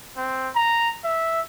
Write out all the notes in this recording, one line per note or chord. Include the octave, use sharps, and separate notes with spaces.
C4
A#5
E5